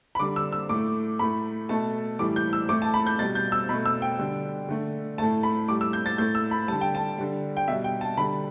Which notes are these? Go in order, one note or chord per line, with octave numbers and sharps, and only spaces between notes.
B5
D3 G3 D6
E6
E6
A2 A3 D6
A2 A3 B5
B2 A3 A5
A2 E3 G3 D6
G6
E6
A2 A3 D6
A5
B5
G6
B2 G3 A6
G6
E6
B2 A3 B5
E6
G5
D3 G3
D3 A3
A2 A3 A5
B5
A2 G3 D6
E6
G6
A6
A2 A3 G6
E6
B5
D3 G3 A5
G5
A5
D3 G3
G5
B2 G3 E5
G5
A5
D3 G3 B5